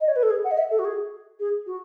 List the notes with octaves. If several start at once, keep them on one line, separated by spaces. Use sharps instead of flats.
D#5
C#5
B4
A4
G#4
F#5
D#5
E5
A4
F#4
G#4
G#4
F#4